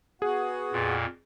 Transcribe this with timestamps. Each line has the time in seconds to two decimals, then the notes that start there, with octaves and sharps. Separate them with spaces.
0.22 B3 F#4 G#4 F#5
0.72 F2 A#2